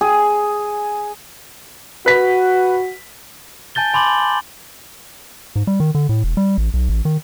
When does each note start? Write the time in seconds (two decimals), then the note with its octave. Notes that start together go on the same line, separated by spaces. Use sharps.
0.01 G#4
2.06 F#4 B4 B6
3.75 G#5 A5 G6 A6 G7
3.94 G#5 B5 C6 D6 F#7
5.56 G#2
5.67 G3
5.80 D#3
5.95 D3
6.09 A2
6.24 E1
6.37 G3
6.58 A1
6.74 B1
6.89 A1
7.05 D#3